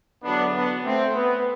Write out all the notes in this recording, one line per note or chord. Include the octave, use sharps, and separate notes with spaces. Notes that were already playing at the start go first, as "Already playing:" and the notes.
E2 D3 F#3 B3 D4
B3 D4
A3 C4
B3